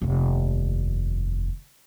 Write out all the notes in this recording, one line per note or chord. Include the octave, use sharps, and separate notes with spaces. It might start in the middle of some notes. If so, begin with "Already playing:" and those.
F1 D#2